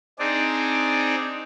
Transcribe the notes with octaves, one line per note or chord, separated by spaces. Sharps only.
C4 D4 D#4 G#4 D5